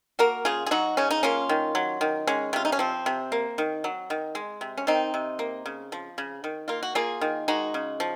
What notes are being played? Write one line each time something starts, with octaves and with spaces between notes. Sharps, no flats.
A#3 F#4 A#4
C#3 F4 G#4
G#4
F#3 D#4 F#4
C#3 C#4
D#4
A#3 C#4 F4
D#3
F#3
D#3
G#3 C#4
C3 F4
D#4
C#4
F3 C4
C3
A#3
D#3
F#3
D#3
G#3
C3
C#4
D#3 C4 D#4
C3
A#3
C#3
F3
C#3
D#3
A#3 F4
F#4
A#3 F4 G#4
D#3
G#3 D#4 F#4
C#3
F3